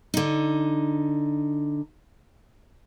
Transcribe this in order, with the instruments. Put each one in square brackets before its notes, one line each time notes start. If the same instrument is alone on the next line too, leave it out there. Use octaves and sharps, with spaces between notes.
[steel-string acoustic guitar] D3 D#4